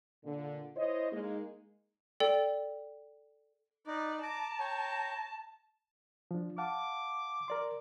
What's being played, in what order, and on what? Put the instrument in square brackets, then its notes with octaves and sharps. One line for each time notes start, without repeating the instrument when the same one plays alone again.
[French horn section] A#2 D3
E4 C5 C#5 D#5
G#3 A#3 D#4
[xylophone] A4 D5 G5
[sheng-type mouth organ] D#4 [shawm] B4 [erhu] D5
[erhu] A5 [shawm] A#5 [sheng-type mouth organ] D6
[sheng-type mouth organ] C#5 G5
[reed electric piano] F3 D4
[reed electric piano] F5 F#5 A5 [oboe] D6
[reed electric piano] A#4 D5 C6